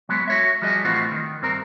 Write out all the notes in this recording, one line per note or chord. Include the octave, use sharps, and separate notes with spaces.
F#3 G#3 B3
F#4 C#5 E5
F3 G3 F#4 G#4 D#5
A2 E3 C4 F4 F#4
D#3
G2 C4 A#4